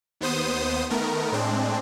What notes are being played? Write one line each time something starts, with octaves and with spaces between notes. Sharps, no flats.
D#2 B3 C5 D#6
D#3 A3 B3 A#4
A2 G#3 C4 D4